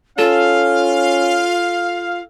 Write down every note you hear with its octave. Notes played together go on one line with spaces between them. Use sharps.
C#4 F4 A4 F5